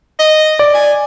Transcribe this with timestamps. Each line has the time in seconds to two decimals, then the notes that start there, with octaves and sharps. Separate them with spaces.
0.19 D#5
0.59 D5
0.74 G#5